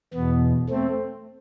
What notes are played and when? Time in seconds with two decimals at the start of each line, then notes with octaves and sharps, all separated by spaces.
0.14 E2 B2 B3
0.69 A3 C4